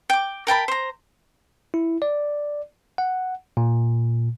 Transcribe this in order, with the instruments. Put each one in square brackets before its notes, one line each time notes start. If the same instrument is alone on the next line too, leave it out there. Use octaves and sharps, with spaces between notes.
[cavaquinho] G5 D6
A#4 G5 A5 B5
C5 A#5
[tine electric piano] E4
D5
F#5
A#2